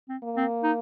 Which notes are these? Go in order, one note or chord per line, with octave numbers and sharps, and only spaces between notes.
C4
A#3
C4
D#4